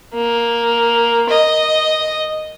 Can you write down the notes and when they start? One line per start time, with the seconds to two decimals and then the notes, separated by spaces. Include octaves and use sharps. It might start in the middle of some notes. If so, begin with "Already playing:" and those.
0.14 A#3
1.29 D#5